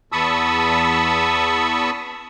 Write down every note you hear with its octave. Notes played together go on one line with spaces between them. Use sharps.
E2 A5 B5 C#6 D#6 E6